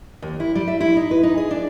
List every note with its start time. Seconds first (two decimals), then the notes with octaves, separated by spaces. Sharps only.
0.22 D#2
0.40 E4
0.55 G3
0.68 E5
0.80 E4
0.97 D#4
1.11 B4
1.23 D#4
1.38 G#4
1.51 D4